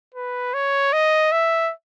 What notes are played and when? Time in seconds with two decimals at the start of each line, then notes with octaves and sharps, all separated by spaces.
0.14 B4
0.54 C#5
0.93 D#5
1.32 E5